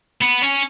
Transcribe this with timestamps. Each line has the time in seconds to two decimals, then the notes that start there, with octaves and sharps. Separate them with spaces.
0.22 B3
0.43 C#4